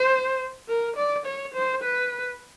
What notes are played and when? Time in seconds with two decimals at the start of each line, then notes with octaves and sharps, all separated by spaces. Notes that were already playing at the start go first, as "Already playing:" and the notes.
Already playing: C5
0.68 A#4
0.96 D5
1.26 C#5
1.54 C5
1.83 B4